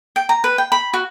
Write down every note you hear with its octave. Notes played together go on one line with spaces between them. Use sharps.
G5
A#5
B4
G5
B5
F#4